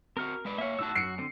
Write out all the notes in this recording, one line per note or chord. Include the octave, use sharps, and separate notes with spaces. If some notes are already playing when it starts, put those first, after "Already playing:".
C4 F#4 A#4 F6
G#3 B4 D5
A#3 C#5 E5 F5
A2 D#4 F#4 A5 E6
F#2 C7 C#7
D3 C4